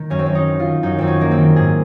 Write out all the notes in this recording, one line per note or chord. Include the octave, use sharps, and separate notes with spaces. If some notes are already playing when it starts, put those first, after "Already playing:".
Already playing: D#3
F#2 C#4
C4
F#2 C#4
D#4
D#3
F4
D#3
F#2 D#4
F#2 C4
C#4
D#3 A#3
C4
D#3
G#2 G#4